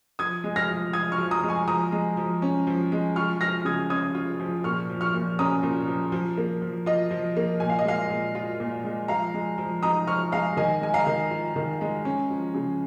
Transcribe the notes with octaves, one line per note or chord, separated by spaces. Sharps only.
F3 D#6 G#6
G#3
F6 A#6
F3
F4 D#6 G#6
C#6 F6
F3
A#5 D#6
G#3
G#5 C#6
F3 A#5 D#6
G#3
F3
C#4
F3
G#3
F4 C#6 F6
F3 F6 A#6
C#3 D#6 G#6
C#4 D#6 G#6
F4
F3
A#2 C#6 F6
F3
C#6 F6
A#2
C#4 A#5 D#6
A#2
F3
F3
A#3
F3
F4 D#5
F3
A#3
A#2 G#5
F5
D#5
G#3 F5
A#2
F4
A#2
G#3
F3 F5 A#5
G#3
F3
D#4 A#5 D#6
F3 C#6 F6
G#3 F5 A#5
D#3 D#5 G#5
G#3 G#5
F5 A#5
D#3
F4
D#3
G#3
C#4
F3
C#3